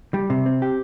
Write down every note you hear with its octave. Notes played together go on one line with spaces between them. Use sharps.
G3
C3
C4
G4